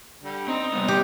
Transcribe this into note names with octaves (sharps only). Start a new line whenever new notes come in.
D3 G3
C4 D#4 A#5
C3 G3 B3
G4